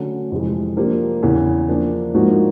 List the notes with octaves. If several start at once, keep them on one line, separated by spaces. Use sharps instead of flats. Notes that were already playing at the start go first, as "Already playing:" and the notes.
Already playing: D3 F#3 A3 C#4
F2 C3 E3 G#3
F3 A#3 D4 G4
E2 C#3 E3
F3 A#3 D4
G#2 F3 A#3 D#4 F#4